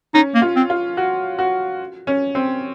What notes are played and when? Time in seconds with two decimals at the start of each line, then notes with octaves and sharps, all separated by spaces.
0.14 C#4 D#4
0.35 A#3
0.42 F4
0.56 C4
0.70 F4
0.97 F#4
1.39 F#4
2.07 C#4
2.35 C4